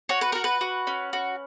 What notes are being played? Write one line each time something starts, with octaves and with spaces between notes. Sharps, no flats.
F#4 C#5
B4
F#4 A#4
B4
F#4
C#4
F#4